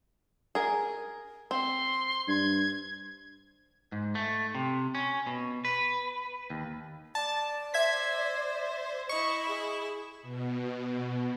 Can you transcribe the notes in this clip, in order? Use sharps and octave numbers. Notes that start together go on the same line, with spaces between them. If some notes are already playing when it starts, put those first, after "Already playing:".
G#4 A#4
C4 C6
G2 G#6
G#2
A3
C3
C#4
B2
B4
D#2
D5 A5
C5 E5 G#6 B6
E4 D#5 E5 C#6
G#4
B2